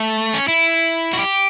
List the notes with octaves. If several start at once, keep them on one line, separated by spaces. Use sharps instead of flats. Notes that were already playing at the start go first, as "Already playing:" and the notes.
Already playing: A3
C#4
E4
F#4
G4